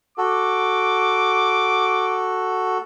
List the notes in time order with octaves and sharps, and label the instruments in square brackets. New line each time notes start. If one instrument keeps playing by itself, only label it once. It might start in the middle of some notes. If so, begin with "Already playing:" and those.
[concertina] F#4 A4 [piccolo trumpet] D6